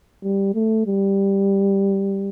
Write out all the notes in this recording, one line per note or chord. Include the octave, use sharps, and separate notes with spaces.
G3
A3
G3